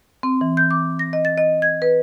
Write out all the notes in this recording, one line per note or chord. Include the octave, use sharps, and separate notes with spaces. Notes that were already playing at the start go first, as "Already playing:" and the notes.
C4
E3
G6
D6
A#6
D#5
A6
D#5
G#6
B4